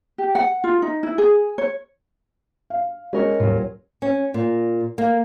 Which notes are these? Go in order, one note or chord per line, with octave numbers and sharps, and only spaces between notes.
G4
F#5
F4
D#4
E4
G#4
C#5
F5
G#3 C#4 A#4 C#5
D#1 F#3 F4
C#4
A#2
A#3